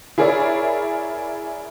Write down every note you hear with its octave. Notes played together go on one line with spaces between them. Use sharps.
E4 G#4 A#4 C#5 D5